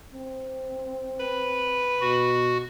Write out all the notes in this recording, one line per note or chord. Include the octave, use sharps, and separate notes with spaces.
C4
B4
B2 F#4